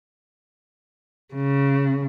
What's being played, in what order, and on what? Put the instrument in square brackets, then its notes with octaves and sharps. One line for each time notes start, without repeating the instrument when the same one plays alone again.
[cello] C#3